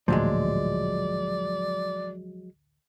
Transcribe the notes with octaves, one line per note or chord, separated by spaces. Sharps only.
A1 D2 A#2 F3 F#3 G#3 D5